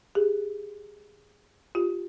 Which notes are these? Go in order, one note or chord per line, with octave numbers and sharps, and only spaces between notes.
G4 G#4
F4 G4